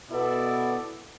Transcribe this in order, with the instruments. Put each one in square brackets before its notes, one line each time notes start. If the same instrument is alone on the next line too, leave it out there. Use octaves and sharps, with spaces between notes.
[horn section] B2 B3 E4 A4 D5